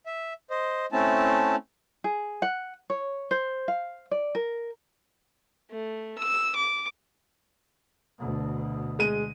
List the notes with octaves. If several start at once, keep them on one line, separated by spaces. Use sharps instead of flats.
E5
C5 D#5
A3 C4 C#4 E4 A5
G#4
F#5
C#5
C5
F5
D5
A#4
A3
E6
D6
D2 B2
G#3 D#7